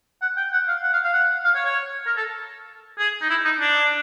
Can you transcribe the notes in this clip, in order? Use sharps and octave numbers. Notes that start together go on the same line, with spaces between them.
F#5
G5
F#5
F5
F#5
F5
F5
F#5
F5
C#5
C#5
A#4
A4
G#4
D#4
E4
D#4
D4